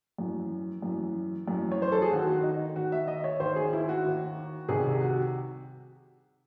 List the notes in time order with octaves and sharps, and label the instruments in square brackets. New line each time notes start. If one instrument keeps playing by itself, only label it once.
[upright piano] F#2 E3
F#2 E3
F#2 E3
C#5
C5
A4
G#4
D#2 D#3 F#4
F#4
D#4
D#2 D#3 F#4
E5
D#5
C#5
D#2 D#3 C5
G#4
E4
F#4
D#2 D#3
C2 C3 D#3 G#4
F#4